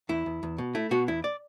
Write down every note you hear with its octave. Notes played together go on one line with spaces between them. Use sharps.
E2 E4
E2
E2
B2
A3 E4
B2 F#4
E2 E4
D5